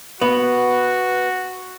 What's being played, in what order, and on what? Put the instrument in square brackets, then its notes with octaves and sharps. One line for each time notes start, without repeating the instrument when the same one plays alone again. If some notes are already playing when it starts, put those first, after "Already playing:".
[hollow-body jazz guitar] B3 [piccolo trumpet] F#4